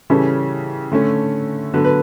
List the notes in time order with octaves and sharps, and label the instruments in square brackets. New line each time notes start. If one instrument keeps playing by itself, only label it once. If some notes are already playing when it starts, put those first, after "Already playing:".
[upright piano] C#3 E3 G3 C#4 A4
D3 A3 C#4
D3 F#3 B3 B4
B4